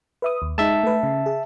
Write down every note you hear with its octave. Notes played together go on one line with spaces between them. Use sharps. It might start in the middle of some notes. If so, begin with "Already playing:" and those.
B4 E5 D#6
D#2
G#3 D#4 E5 A5
A3 B4
C#3
G#4